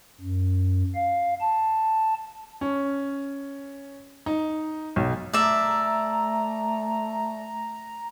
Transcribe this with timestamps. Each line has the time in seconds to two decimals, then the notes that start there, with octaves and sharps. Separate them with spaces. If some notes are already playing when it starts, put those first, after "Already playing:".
0.21 F#2
0.95 F5
1.41 A5
2.61 C#4
4.26 D#4
4.96 B1
5.33 A3 D5 E5 A#5